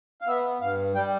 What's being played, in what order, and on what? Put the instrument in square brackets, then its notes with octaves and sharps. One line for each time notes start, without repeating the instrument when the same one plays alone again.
[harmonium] F5
B3 E5
G2 F5
G3 G5